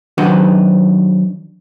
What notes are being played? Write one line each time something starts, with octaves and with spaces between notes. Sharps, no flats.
D#3 F#3 D4 F#4 B4 C5